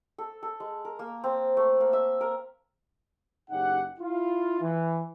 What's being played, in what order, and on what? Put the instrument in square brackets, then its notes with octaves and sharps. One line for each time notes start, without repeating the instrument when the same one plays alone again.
[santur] A4
A4
G#3
A#4
A#3
C4
A3
A#3
E5
A#4
[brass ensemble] F#1 C#3 D#4 G4 F#5
E4 F4
E3